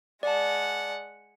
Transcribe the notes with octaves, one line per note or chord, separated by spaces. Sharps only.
G#3 D5 F#5 A5